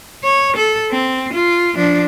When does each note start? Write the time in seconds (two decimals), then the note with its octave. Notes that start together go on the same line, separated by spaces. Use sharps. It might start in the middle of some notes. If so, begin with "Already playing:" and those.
0.24 C#5
0.56 A4
0.91 C4
1.33 F4
1.74 F3 D4